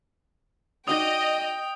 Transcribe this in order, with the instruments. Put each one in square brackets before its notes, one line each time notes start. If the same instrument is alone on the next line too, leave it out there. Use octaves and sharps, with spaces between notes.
[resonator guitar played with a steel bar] D#4 F#4 D5 [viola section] D#5 [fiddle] G5 [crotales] D#6